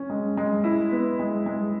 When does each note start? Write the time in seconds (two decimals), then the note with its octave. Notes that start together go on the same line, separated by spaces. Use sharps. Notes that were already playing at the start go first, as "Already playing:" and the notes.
Already playing: C#4
0.10 G#3
0.37 G#3
0.64 E4
0.92 B3
1.20 G#3
1.46 G#3